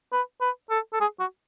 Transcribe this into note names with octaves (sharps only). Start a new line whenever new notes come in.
B4
B4
A4
A4
G#4
F#4